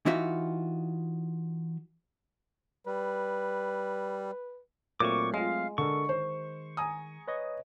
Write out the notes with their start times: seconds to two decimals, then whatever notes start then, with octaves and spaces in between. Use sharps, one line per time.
0.06 E3 D#4 F4 F#4 E5
2.87 G3 B4
5.00 A#2 F#3 A3 C4 C#6 D6
5.34 G#3 F4 D#5 F5
5.78 D3 A4 A#4 C#6
6.09 D#3 C5
6.77 G#5 A#5 D#6
7.28 B4 C#5 D#5